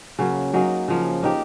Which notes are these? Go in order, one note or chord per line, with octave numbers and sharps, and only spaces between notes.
C#3 F#3 A#3
F#3 A#3 D#4 G#4
C#3 F3 A#3
A#3 D#4 G4